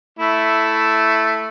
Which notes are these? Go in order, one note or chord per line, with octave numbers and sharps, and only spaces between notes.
A3 E4